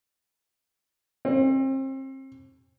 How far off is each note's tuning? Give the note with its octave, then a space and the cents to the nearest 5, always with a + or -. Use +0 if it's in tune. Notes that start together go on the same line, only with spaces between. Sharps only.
C4 +35